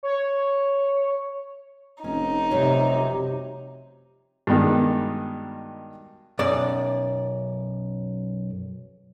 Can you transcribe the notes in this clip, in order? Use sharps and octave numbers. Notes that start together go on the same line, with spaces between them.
C#5
F1 C#4 D#4
F#2 C3 F#3 G3
G2 B2 D#3 G#3
B1 F#2 D5